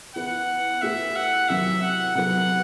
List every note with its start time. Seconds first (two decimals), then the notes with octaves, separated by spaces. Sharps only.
0.16 E3 B3 E4 F#5
0.82 A3 E4 G4 B4 E5
1.16 F#5
1.49 C3 D#3 F#3 C4 E4 E5
1.82 F#5
2.15 C3 F#3 B3 E4 A4 F#5